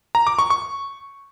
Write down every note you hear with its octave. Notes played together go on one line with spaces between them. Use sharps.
A#5
D6
C#6
C#6